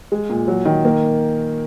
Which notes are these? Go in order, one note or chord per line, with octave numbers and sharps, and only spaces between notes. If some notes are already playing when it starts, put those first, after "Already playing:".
G#3
A#2
F#3
D#3
A#3